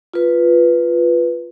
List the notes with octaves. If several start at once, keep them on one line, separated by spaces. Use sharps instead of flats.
F4 B4